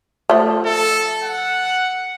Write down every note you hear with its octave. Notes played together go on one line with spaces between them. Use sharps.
F3 A3
A4
F#5